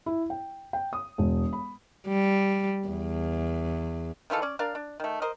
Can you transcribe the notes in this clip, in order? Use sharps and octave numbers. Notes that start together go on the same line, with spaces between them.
E4
G5
G5
D#6
E1
B5
G3
E2
D#3 E3 F4 A4
C#4 D5
D4 A#4 D5 F5
D4
D#3 A3
A#4 C5 D#5